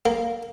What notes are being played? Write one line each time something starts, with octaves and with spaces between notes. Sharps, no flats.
A#3